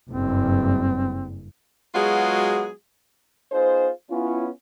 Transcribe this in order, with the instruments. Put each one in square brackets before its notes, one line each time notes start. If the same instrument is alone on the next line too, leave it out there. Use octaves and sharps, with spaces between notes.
[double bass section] F#1 G2 [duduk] C4
[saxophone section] F#3 G#3 B3 F4 F#4 G#4
[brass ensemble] B3 D#4 F4 G#4 C5
B3 C#4 E4 F4